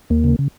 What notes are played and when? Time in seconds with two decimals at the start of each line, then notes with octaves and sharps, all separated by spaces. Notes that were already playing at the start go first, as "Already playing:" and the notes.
0.10 D#2 A#3
0.24 C#3
0.39 C#3